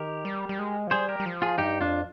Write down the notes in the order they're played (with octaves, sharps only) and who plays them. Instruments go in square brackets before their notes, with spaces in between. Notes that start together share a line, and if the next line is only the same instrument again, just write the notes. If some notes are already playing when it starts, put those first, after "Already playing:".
Already playing: [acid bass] D#3 [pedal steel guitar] G4 A#4
[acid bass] G3
G3
G#3
F3
[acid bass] G3 [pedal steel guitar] G#4 C5
[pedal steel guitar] G4 A#4
[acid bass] G3
F3
[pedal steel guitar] F4 G#4
[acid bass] G2 [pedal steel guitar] D#4 G4
[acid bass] F2 [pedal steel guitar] D4 F4